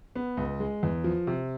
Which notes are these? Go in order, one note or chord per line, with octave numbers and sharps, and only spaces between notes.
B3
C#2
G#3
E2
F3
C3